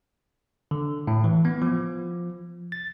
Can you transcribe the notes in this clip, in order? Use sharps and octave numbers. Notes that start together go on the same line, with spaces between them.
D3
A2
E3
B3
F3
A6